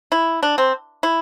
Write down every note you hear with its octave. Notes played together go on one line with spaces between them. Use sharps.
E4
D4
C4
E4